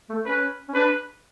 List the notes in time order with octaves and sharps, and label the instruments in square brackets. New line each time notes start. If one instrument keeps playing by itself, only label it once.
[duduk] A3
[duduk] C#4 [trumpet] B4
[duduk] C#4
[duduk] D4 [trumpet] B4